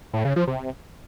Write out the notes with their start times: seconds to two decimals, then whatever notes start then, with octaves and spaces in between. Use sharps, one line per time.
0.13 A2
0.25 C#3
0.36 F3
0.47 C3